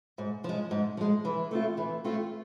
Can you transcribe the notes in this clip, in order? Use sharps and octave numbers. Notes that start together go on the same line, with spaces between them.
G#2
F3 G#3
G#2
F3 G#3
E3
A3 C4 F4
E3
A3 C4 F4